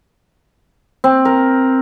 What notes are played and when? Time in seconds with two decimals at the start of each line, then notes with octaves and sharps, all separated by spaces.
1.04 C4
1.25 A#4